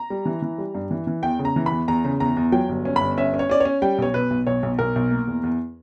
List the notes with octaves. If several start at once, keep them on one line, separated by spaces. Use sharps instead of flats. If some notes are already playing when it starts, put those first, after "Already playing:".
Already playing: A#5
G3
E3
E3
G3
G2
E3
E3
E2 G5
C#3
A#5
E3
B5
E2
E2 A#5
C#3
E2 A#5
E2
F#3 G5
G1
C#4
G1 B5
C#4 E5
C#4
C#5
C#4 D5
C#5
C#4
G3 G5
B1 C#5
B2 B4
B1
B1 C#5
B1
B1 A#4
B1
A#3
E2
E2